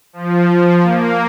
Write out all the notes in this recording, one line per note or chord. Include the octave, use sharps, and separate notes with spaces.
F3
F3
A#3